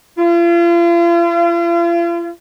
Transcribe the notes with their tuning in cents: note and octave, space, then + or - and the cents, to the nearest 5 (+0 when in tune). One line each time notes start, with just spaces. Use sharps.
F4 -40